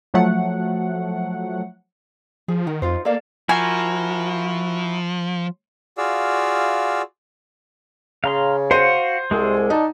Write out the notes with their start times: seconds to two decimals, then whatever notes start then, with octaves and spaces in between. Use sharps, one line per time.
0.14 F3 F#3 A3 F#5
2.48 F3 G#4
2.67 D#3 A#4 F#5
2.82 F2 D#4 F4 C5
3.05 A#3 A4 D5 F5
3.49 F3 E4 F#4 A#4 G#5
5.98 F4 F#4 G#4 D5 F5 E6
8.24 C#3 F5 A#5 C6
8.71 F#4 C5 F5 F#5 D#7
9.31 C2 G#3 G#4 A4
9.70 D#4 D5 F#5 A5